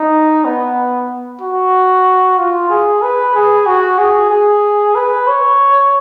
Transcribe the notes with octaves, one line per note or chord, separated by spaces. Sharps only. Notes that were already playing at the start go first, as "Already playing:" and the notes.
Already playing: D#4
B3
F#4
F4
G#4
B4
G#4
F#4
G#4
G#4
B4
C#5